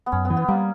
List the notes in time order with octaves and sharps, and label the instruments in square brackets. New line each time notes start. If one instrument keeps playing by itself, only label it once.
[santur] B3
[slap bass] F#2 [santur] C#4
[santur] B3
[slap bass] E3
[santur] B3
[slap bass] G3 [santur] A#3